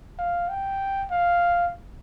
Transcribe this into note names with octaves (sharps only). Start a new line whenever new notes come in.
F5
G5
F5